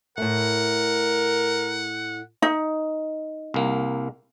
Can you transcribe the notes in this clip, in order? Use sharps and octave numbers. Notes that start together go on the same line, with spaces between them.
A2 A3 A#4 F#5
D#4
C2 A#3